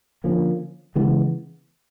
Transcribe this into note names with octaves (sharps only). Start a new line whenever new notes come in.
D3 F3 A#3 C#4
C#3 E3 G#3 B3